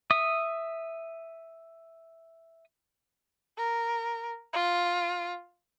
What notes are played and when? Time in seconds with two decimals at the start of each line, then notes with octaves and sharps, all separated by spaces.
0.11 E5 D#6
3.58 A#4
4.54 F4